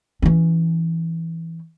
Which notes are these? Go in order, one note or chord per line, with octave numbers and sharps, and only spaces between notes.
E3 C#4